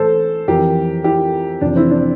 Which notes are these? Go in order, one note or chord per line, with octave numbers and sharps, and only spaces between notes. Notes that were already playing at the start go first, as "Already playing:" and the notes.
Already playing: A2 E3 A4 C5
F2 E3 G4 A#4
E4 G4
F2 C3 E3 D4
C4 E4
D4